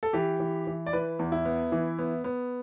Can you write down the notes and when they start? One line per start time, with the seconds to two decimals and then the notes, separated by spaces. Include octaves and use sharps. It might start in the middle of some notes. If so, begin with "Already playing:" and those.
0.03 A4
0.13 E3 G4
0.40 E3
0.67 E3
0.86 D5
0.93 E3 B4
1.19 E2
1.32 E4
1.45 B3
1.72 E3
1.99 B3
2.24 B3